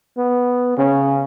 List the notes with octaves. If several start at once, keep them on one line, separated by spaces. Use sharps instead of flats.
B3
C#3 C#4